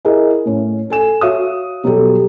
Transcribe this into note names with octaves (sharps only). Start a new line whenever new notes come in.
E4 G#4 A#4 D#5
A2 C#4
A4 G#5 E7
F#4 C#5 E5 F5 D#6
B2 F#3 G3 G4 A4